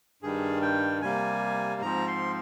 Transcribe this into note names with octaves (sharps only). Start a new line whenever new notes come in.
G2 D#3 G3 G#4
G5
C3 G3 A#3 G#5
G#2 F3 C4 A#5
C6